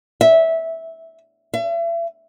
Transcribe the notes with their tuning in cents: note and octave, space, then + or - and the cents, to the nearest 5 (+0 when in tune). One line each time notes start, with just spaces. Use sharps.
E5 -15
E5 +40